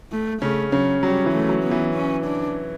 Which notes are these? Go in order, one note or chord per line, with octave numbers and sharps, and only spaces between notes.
A3
C#3 A3 C#4
C#3 F#3 C#4
F#3 G3
E3
A3
F#3
B3
E3
C#4
D4